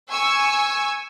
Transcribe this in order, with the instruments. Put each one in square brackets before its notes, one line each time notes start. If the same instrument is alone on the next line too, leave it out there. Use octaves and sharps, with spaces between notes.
[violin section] G#5 C#6 E6